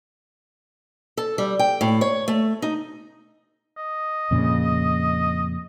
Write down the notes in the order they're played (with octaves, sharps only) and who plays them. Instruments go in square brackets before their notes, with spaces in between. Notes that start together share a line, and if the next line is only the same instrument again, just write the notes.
[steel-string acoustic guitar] A4
G3
G5
A2
C#5
A3
D#4
[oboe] D#5
[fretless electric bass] F2 A#2 C#3